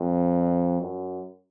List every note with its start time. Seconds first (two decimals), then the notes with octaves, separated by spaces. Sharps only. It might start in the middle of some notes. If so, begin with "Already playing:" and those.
Already playing: F2
0.82 F#2